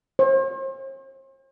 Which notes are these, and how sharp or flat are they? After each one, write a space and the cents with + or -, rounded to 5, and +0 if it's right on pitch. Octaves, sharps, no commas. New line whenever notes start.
C5 +45